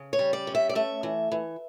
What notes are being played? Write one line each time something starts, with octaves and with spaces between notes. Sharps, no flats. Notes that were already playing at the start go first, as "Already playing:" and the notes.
Already playing: C#3
C#5
G3
D5
C#4
E5
D5
A3 E5
E3
E3